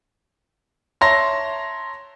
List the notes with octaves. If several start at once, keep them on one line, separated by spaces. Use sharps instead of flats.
C#5 E5 A5 A#5 C6 A#6